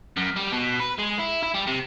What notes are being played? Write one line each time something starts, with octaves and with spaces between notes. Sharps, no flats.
F#2
G3
B2
B4
G#3
E4
E4
G3
C3